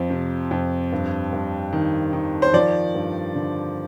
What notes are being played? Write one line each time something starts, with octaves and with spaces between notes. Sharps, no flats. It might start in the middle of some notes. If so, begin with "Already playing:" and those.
Already playing: F2 F3
C3
F2
G2
G2
D#3
D#3
C5
F3 D5
G2
D3